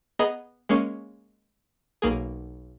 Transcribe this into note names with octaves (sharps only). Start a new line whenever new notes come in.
B3 G#4 D#5 A#5 B5
G#3 A#3 C#4
B1 A#3 G#4